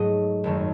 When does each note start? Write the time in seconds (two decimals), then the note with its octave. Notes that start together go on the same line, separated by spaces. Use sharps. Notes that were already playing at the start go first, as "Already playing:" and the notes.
Already playing: G#2 F#3 A3 D#5
0.44 G#1 F#2 D#3 A3 C#4